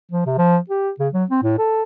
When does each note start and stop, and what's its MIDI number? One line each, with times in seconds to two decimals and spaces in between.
0.11 0.25 53
0.26 0.33 48
0.38 0.58 53
0.70 0.90 67
0.99 1.08 49
1.13 1.25 54
1.30 1.42 60
1.43 1.58 45
1.58 1.83 69